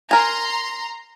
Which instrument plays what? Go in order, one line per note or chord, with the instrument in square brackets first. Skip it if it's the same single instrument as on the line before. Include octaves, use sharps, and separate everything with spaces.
[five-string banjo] A#4 G#5 [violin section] A#5 C6